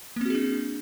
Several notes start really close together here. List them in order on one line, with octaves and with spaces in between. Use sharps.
A#3 C4 F#4 G#4 D4